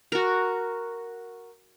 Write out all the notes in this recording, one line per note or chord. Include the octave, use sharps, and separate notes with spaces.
F#4 A#4